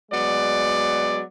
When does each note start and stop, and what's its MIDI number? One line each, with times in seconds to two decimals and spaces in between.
0.12 1.21 54
0.12 1.21 56
0.12 1.21 59
0.12 1.21 74